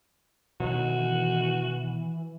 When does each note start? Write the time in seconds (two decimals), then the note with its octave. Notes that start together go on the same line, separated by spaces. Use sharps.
0.60 B2 D#3 E3 F#4